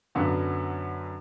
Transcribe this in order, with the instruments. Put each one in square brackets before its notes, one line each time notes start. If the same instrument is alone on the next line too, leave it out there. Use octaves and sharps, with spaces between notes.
[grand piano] F#2 D3 F#3 B3